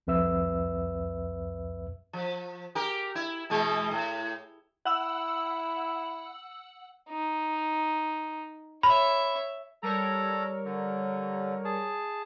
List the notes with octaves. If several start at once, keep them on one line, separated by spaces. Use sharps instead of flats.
C2 F2 B4 E5 E6
F3
G4 A#4
E4
B2 E3 G#3
A2
E4 F#5 E6 F#7
D#4
C#5 E5 B5
G3 A4 A#4 C#5 A#5
D3
G#4 A5